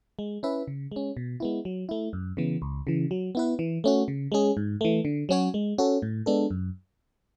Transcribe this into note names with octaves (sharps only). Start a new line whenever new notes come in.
G#3
C#4 E4 B4 E5
C#3
G#3 C#4
B2
G#3 B3 E4
F#3
A3 E4
F#2
C#3 E3 B3
C#2
C#3 E3
F#3
B3 E4 B4
E3
A3 C#4 F#4
C#3
G#3 C#4 G#4
G#2
E3 A3
D3
F#3 C#4 F#4 C#5
G#3
C#4 F#4 A4
A2
G#3 B3 D4 A4
F#2